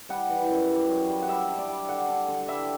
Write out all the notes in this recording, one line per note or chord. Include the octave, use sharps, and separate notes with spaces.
G3 F#5
E3
F#2
G3
F#2
G3
F#5
G3 E5
D4
D5
G3
D3 F#5
D4
D3
G3 E5